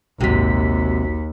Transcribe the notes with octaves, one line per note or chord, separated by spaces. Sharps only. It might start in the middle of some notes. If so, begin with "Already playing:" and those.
A#1 D#2 G#2 C3 F#4 B6